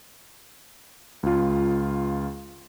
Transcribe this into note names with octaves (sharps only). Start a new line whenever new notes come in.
C#2 F4